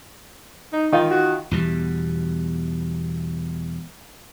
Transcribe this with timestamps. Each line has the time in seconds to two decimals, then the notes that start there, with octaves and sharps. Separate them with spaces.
0.73 D#4
0.92 D#3 D#4 F4
1.11 F#4
1.51 E2 B2 G3